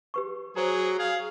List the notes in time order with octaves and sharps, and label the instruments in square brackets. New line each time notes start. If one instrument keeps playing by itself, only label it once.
[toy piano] G4 B4 C#6
[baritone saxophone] F#3 [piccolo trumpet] G#4 [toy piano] C5 A#5
[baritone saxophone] G#4 [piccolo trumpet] F5